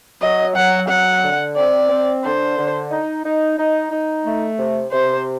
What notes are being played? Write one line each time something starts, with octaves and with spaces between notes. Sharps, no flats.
F#3 D#5
F#3 F#5
F#3 F#5
D3
C4 D5
C4
D3 C5
D3
D#4
D#4
D#4
D#4
A3
C3
C3 C5